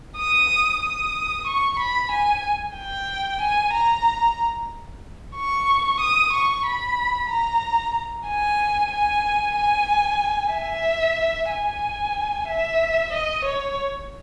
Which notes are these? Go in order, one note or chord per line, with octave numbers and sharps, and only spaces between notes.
D#6
D#6
C#6
B5
G#5
G5
G#5
A#5
C#6
D#6
C#6
B5
A#5
G#5
G#5
G#5
E5
G#5
E5
D#5
C#5